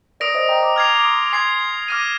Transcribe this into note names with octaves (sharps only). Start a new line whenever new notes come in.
A#4 D5 D#6 A#6 D7
C5 D#5
G5 A#5
A#5 D6
A#5 D6 F6 G#6 C7 F7
D6
C6 D#6
G#5 C6 G#6 C7 F7
D6 F6 A#6 D#7